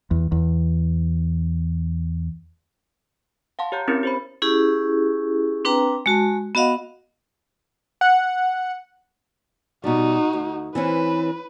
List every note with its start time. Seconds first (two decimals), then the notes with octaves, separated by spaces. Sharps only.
0.11 E2
0.32 E2
3.59 F5 F#5 A5 C6
3.72 G4 C#5 A#5 G6
3.88 C4 C#4 E4 G4 A#4 C#7
4.03 G4 C5 B5
4.42 C#4 E4 G4 G#4
5.65 C4 D4 B4 G5 A#5
6.06 G#3 F#4 A5
6.55 B3 F#4 D#5 F5 F#5
8.01 F#5
9.84 B2 G3 D#4 F#4
10.33 D2
10.75 E3 C4 C#4 B4